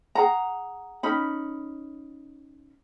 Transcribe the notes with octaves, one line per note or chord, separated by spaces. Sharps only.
G#4 F#5 A#5
C#4 D#4 B5